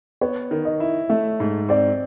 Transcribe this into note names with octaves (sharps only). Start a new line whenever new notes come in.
B3 C#5
D#3
D#5
E4
A3 E5
G#2
C4 D5